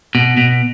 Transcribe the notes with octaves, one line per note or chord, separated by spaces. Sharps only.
B2
B2